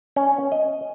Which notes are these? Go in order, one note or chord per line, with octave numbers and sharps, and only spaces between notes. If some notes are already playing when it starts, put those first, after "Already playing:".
C#4
D#5